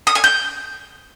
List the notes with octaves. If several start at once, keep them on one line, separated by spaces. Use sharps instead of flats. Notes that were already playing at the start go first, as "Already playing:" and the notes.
D#6
G#5
G6